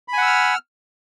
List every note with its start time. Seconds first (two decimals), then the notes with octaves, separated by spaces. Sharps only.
0.08 B5
0.13 G#5
0.18 F#5
0.22 E6
0.27 F6